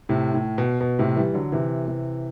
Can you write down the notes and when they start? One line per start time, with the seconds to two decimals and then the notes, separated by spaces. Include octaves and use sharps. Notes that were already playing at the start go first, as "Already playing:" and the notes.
0.09 A2 C3
0.34 A2
0.58 B2
0.81 B2
0.99 A2 C3
1.16 E3 G3
1.34 D3 F#3
1.52 C3 E3
1.88 C3 E3